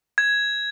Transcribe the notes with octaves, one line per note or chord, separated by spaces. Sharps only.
G#6